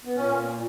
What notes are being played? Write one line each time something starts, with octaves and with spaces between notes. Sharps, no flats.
B3
A#2 C#4